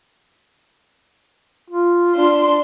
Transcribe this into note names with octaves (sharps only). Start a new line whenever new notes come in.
F4
D4 C6